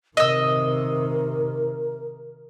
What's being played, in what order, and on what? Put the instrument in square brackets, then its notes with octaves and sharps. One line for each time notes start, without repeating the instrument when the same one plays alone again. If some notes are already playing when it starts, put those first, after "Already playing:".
[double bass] C3 D#3 [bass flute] A#4 [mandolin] D#5 E6